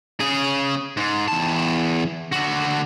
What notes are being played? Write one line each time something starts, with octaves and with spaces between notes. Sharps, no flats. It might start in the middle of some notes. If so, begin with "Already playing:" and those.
C#3 G#4
G#2
E2 A5
D3 F#4